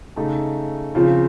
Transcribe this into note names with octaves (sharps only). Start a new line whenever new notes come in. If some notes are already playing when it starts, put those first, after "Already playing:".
C#3 A3 D#4 A4
C#3 F3 C4 F4